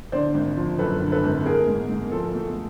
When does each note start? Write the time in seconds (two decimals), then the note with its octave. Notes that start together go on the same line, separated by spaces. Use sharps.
0.12 D3 C5 D5
0.34 G#1
0.56 F3
0.79 F#2 A4 B4
1.01 D3
1.12 A4 B4
1.23 G#1
1.46 A3 G#4 A#4
1.67 G#2
1.89 G#2
2.11 F3 A4
2.34 A3